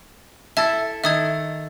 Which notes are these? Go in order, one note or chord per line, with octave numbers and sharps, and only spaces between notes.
E4 A4 E5 A5
D#3 A4 E5 D#6 G#6